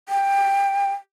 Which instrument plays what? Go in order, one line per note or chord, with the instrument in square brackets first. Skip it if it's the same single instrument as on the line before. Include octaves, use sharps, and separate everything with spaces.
[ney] G5